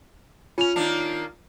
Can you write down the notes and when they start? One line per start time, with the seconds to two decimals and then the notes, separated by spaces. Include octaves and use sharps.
0.58 C#4 F4 F7
0.76 D#3 A#3 D4